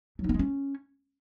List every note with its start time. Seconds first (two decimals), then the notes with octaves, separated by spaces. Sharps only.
0.19 F#3
0.24 D#4
0.29 B3
0.34 G#3
0.39 C#4